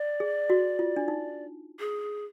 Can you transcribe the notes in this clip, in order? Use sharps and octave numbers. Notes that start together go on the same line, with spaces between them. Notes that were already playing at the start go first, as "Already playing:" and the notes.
Already playing: D5
G#4
F#4
F4
D4
D#4
G#4